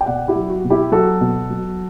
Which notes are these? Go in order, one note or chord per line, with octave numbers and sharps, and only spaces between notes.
G5
B2 D5 F#5
E4 G4
F#3
F#4
B2
E4 G4
F#3 F#4 A4
B2
F#3